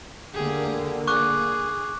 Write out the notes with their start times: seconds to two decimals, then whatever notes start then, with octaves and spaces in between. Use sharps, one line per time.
0.35 D3 A#3 G4 G#4
1.07 G#4 C#6 D6 F#6